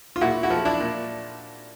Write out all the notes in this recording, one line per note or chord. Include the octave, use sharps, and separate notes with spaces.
F4
A#2 E4 F#4
E4 F#4
F3
D4 E4
A#2